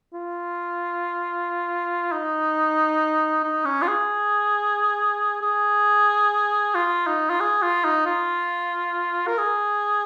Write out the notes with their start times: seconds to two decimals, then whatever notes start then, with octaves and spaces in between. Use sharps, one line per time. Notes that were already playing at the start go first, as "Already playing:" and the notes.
0.14 F4
2.12 D#4
3.44 D#4
3.65 C#4
3.82 F4
3.88 G#4
5.42 G#4
6.74 F4
7.07 D#4
7.30 F4
7.40 G#4
7.62 F4
7.85 D#4
8.06 F4
9.27 A#4
9.38 G#4